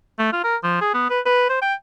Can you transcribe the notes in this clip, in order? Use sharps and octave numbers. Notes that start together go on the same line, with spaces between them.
A3
F4
A#4
F3
G#4
B3
B4
B4
C5
G5